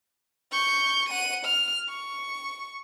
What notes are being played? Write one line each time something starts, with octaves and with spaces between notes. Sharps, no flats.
C#6 G6
F#5 D#7
F6
C#6